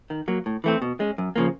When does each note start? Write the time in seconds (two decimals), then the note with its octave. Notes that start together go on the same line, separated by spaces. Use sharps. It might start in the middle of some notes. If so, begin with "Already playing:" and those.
0.10 D#3
0.28 F#3 A#3
0.46 A2
0.64 E3 A3 C4
0.82 B2
1.00 G#3 C#4
1.18 F#2
1.36 C#3 F3 A#3